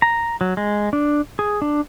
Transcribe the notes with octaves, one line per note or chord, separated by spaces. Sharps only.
A#5
F#3
G#3
D4
G#4
D4